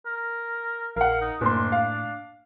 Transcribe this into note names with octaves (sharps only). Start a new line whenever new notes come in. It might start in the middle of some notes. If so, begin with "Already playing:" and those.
A#4
A#1 A#4 F5 F#5
D#4
F#1 A2 D4 C6
F5